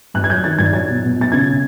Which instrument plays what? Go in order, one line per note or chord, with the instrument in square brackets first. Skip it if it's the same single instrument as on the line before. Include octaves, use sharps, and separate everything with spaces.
[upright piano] G2 F#6
G#6
F#3 G6
D#3 A6
G2 G#6
F#3 A6
B2
B2
B2
A6
C#3 G#6